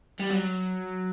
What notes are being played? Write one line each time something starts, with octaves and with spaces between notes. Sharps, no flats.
G3
F#3